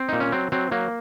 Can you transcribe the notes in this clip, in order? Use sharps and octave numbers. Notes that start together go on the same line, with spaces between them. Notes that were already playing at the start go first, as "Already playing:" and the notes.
Already playing: C4
A#2 D#4
C#4
F#3 C4
F#3 C4
F#3 A#3